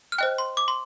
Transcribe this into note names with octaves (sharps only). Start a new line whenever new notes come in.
F6
C5 D#5 G5 F#6
C6
D6
C6